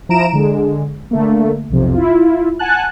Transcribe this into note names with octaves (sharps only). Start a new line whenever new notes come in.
F3 E4 A#5 D7 E7
D3 G#3
D3 A3 A#3
B1 F2 C3
E4 F4
F#5 G#5 A5 F#6